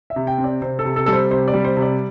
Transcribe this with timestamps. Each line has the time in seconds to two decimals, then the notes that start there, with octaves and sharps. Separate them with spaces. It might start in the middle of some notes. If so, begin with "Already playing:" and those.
0.10 E5
0.16 C3
0.27 G5
0.38 C4
0.44 D5
0.62 C3 C5
0.79 A4
0.85 C3
0.96 A4
1.06 G3 A4
1.13 C5
1.31 C3 C5
1.48 D5
1.54 G3
1.65 C5
1.77 C3
1.82 D5